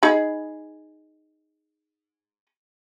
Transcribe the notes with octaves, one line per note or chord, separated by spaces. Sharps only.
D#4 G#4 B5